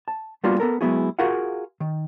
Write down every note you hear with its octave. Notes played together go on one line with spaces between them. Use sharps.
A5
G3 A#3 B3 D4 F4 F#4
B3 A4 A#4
F#3 G#3 B3 E4 F#4 G#4
F4 F#4 G#4 A#4 F5 F#5
D#3